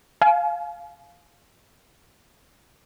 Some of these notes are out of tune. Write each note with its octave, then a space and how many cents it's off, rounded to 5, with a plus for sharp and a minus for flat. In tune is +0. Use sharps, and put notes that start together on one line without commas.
F5 +0 G#5 +40